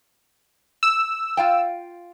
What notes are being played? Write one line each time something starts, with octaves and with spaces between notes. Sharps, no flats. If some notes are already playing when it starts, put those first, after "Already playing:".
E6
F4 F5 G5